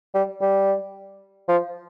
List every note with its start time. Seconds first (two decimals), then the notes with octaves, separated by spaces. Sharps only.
0.14 G3
0.41 G3
1.48 F3